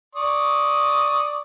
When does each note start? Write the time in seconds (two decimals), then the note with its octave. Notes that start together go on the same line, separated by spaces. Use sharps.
0.15 D5 C#6 D#6